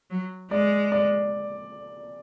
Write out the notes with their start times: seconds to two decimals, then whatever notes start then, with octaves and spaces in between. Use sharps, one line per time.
0.10 F#3
0.51 G#3 D5
0.92 D5